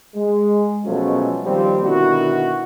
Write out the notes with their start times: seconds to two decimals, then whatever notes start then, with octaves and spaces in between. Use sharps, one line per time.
0.15 G#3
0.85 B2 F3 F#3 G#3 A3 C#4
1.45 D#2 F3 G3 C4
1.85 B2 D3 D#3 E4 F#4